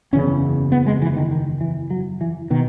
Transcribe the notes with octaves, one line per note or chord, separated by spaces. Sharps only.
F#1 E2 C#3 C#4
B3
G#3
E3
D#3
D#3
E3
F#3
E3
B2 D#3